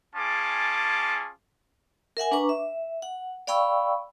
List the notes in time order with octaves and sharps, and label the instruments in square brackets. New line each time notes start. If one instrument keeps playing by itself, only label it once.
[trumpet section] C#4 F4 G#4 A5 D6
[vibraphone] A#4 E5 F#5 G#5
D4 B4 A#5 C#6 D6
E5
F#5
D5 F5 G5 B5 C#6 E6